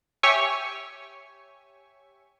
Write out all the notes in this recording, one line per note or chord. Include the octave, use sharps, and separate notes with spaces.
G4 C#5 E5 G#5 C#6